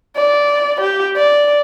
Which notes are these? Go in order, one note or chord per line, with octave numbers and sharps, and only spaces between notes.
D5
G4
D5